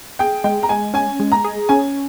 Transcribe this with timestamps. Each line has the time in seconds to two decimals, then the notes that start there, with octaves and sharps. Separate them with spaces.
0.19 G#4 G5
0.44 G#3 G5
0.63 A#5
0.69 G#3 G#5
0.94 C#4 G#5
1.20 G#3
1.32 A#5
1.45 G#4
1.69 C#4 G#5